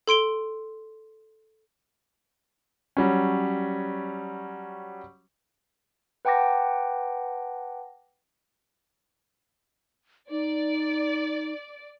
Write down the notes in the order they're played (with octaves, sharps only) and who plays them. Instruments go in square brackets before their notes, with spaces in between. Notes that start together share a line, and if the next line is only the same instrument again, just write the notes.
[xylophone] A4 C6 D7 G7
[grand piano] F#3 G3 C#4
[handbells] B4 F#5 G5 A5 D6 A#6
[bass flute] D#4 [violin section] D5